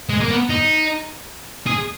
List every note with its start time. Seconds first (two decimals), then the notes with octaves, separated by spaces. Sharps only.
0.09 G#3
0.21 A#3
0.30 B3
0.50 D#4
1.67 G#4